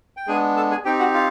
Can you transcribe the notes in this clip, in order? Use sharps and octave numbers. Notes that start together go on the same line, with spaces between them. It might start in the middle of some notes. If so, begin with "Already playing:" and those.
G5
G#3 B3 D4 G#4 G#5
A4 A5
G#4 G#5
C4 D#4 G4 G5
F#4 F#5
F4 F5